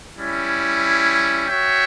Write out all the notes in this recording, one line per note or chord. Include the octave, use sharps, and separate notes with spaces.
G3 C#4 E4
F#4 C#5 E5 G5